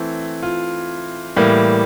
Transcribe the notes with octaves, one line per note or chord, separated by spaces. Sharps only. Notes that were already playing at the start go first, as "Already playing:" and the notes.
Already playing: E3 A3 C4
F4
A2 E3 G3 A#3